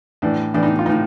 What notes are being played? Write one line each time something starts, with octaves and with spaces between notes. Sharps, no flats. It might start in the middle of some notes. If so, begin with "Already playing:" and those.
A2 E3 D4
A2 E3 D4
D#4
F4
A2 E3 D#4